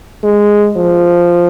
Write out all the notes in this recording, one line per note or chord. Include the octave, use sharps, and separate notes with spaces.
G#3
F3